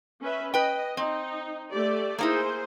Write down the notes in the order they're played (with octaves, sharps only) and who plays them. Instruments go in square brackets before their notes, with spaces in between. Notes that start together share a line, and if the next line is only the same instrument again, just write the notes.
[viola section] C#4 B4 E5
[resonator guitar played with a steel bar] B4 G5 [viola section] D#5
[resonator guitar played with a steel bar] C4 [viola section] D#4
[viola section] A3 G4 D5
[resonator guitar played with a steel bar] A#3 D#4 E4 [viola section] G#4 C5